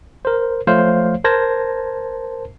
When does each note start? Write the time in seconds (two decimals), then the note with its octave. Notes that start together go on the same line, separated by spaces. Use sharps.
0.25 A#4 C5
0.67 F3 A3 C5 C#5 F5
1.24 A#4 C5 A5 G#6 A#6